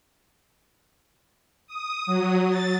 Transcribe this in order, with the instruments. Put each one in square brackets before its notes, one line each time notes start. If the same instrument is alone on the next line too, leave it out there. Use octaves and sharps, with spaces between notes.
[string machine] D#6
F#3
A6